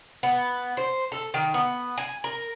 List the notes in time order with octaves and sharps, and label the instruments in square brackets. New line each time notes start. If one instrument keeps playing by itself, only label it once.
[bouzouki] B3
C5
A4
D#3
B3
G#5
A#4